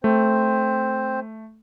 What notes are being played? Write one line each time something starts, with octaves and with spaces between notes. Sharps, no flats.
A3 C4 C5